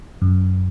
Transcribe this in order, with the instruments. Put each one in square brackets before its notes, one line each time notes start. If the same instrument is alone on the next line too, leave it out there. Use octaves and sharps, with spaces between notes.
[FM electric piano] F#2